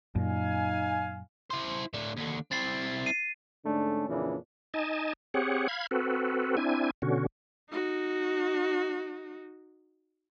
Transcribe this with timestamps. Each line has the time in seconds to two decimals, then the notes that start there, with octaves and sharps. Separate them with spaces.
0.15 F#2 A#2 D#4 F5 G#5
1.50 E4 C5
1.94 A2 D4
2.17 D#2 D3
2.52 C4 E4 A6 C7
3.06 C7 D#7
3.65 G#2 D3 A3 C#4 D4
4.08 F2 A#2 C#3 E3 C#4 D4
4.74 D#4 D#5 G#5 A5
5.34 C4 G4 G#4 C#5 F#5
5.68 F5 B5 G#6
5.91 C4 F#4 A4 B4
6.57 C4 D4 E4 G#5
7.02 B2 D3 C#4 F#4
7.70 D#4 F#4